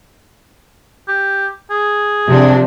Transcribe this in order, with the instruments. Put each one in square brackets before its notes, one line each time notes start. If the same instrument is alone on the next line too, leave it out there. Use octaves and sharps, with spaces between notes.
[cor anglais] G4
G#4
[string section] C3 F3 D4